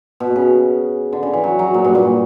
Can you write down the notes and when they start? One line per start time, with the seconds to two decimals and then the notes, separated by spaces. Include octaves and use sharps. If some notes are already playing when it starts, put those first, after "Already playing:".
0.20 B2
0.36 C#3
1.13 D3
1.23 C#3
1.33 E3
1.44 F#3
1.59 F#3
1.74 A#2
1.84 G2
1.95 A#2